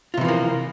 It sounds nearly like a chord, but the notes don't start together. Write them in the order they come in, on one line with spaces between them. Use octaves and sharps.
F4 C3 E3 F3 A#3